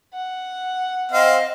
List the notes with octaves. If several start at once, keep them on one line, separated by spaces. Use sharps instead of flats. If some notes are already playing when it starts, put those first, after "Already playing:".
F#5
C4 D#5 F5